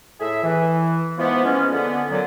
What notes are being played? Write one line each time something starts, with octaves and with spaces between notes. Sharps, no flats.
A2 G#4 E5
E3
G#2 E3 F3 G#3 B3
E3 F3 G#3 A#3 C#4
D3 B3
A#2 D3 F#3